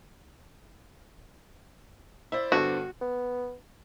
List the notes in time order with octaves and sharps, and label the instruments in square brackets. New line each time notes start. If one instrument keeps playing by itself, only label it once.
[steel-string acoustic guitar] E4 C5 D5 [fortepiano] E5
[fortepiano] G2 D3 B3 [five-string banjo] F#4
[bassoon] B3